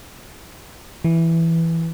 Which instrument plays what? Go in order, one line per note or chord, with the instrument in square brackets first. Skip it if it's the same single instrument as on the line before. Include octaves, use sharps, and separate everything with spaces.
[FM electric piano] E3